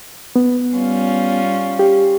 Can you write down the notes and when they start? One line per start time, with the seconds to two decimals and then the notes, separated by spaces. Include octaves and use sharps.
0.36 B3
0.76 G3 C#4 F4
1.79 G4